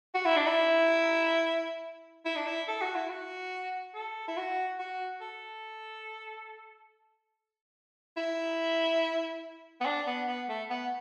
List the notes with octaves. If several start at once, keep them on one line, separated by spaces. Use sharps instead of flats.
F#4
E4
D4
E4
E4
D4
E4
A4
F#4
E4
F#4
A4
E4
F#4
F#4
A4
E4
B3
D4
B3
B3
A3
B3